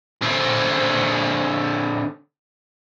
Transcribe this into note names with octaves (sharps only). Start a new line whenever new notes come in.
D3 C4